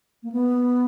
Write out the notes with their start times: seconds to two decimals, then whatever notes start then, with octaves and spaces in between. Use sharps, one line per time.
0.23 A#3
0.32 B3